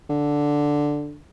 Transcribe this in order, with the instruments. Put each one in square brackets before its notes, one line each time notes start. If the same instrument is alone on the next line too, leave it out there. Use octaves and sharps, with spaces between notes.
[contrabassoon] D3